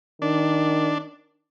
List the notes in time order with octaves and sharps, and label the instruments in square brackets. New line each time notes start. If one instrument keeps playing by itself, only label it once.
[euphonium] D#3 [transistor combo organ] D4